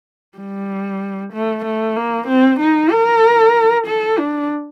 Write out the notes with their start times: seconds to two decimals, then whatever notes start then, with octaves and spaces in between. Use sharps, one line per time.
0.38 G3
1.33 A3
1.65 A3
1.96 A#3
2.28 C4
2.60 D#4
2.92 A#4
3.87 A4
4.19 D4